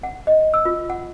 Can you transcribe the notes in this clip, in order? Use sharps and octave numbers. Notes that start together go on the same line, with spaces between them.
F#5
D#5
E6
F4
F#5